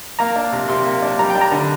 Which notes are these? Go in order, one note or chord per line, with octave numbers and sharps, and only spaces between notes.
A#3 A#5
D4
C3
C3 C6
A#3
D4
G3 A#5
G5
D4
A#5
D3